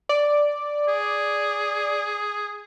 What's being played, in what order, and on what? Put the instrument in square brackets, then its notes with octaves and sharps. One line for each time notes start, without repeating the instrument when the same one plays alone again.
[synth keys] D5
[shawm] G#4